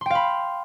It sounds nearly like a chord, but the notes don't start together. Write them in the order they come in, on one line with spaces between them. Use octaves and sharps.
C6 G5 F5 B5